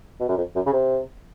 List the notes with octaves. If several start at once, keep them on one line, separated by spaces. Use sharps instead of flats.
B2
F#2
F2
F#2
C#3
C3